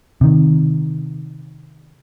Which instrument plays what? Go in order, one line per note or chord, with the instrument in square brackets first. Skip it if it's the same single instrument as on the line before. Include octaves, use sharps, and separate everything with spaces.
[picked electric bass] C3 D#3